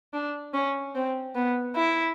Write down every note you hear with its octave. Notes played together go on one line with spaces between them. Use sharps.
D4
C#4
C4
B3
E4